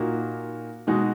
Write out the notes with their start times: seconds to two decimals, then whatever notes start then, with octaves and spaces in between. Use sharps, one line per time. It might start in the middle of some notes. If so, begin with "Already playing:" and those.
Already playing: A#2 A#3 D#4 F#4
0.87 B2 G#3 D#4 F#4